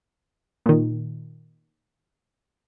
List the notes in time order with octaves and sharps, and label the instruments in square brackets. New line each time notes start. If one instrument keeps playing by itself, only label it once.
[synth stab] A#2 D#3